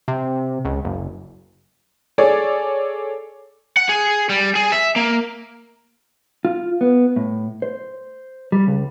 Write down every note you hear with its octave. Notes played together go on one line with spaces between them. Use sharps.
C3
C#2
F#1
G#4 A4 C#5 D5
F#5
G#4
G3
G#4
E5
A#3
F4
B3
A2
C5
G3
C#2